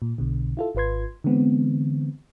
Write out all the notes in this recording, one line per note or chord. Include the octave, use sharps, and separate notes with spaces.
A#2
B1 B2 D3
E4 F4 A4
G#1 F4 B4 C6 G#6
D3 E3 G#3 B3 C4